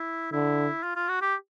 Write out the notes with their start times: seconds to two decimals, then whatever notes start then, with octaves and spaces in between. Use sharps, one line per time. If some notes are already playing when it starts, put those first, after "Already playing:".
Already playing: E4
0.32 D3 E4
0.83 F4
0.96 F4
1.09 F#4
1.21 G4